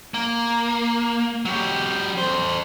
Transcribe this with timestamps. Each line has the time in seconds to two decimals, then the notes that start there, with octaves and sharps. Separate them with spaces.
0.14 A#3
1.45 F#3 G4
2.18 A4 C5